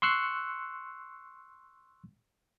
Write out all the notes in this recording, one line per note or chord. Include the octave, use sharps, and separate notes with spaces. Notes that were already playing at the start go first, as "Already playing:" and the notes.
C6 C#6 E6 F#6 C7 C#7